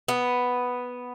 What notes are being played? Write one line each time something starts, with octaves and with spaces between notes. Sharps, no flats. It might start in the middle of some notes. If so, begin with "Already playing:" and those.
B3